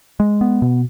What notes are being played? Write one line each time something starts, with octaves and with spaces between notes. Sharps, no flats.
G#3
B3
B2